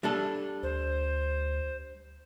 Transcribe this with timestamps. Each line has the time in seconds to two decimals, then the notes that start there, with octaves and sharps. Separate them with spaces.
0.03 G3 D4 A4
0.63 D2 C5